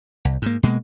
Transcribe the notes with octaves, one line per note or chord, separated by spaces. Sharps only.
C2
G#2 A#3
B2 G#3 A#3